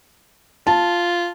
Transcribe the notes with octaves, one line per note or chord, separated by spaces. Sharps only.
F4 A5